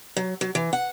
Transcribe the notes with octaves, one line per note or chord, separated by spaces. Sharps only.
F#3
F#3
E3
F#5